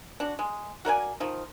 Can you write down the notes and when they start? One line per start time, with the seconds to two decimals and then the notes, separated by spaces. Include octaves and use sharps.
0.20 D4 F#4
0.39 G#3
0.85 F#4 A#4 D5 G#5
1.20 D#3 F3